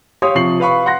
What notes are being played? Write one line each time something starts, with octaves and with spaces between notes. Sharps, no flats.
G4 C#5 F5 C6 D#6
C3 F3 C#6 C7 F#7
B4 F5 B5 C#6
F#5 C6 F#6 A#6